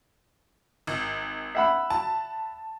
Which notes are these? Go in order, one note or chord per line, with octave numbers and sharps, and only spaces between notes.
G#1
E5 F#5 B5
A5